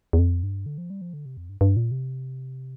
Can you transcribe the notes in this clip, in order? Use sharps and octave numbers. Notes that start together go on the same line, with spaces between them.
E2
F2
G2
D3
F3
G3
F3
D3
C3
F2
G2
G2
A#2
C3